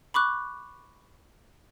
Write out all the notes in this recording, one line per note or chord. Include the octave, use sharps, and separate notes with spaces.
B5 C#6 D6 F#6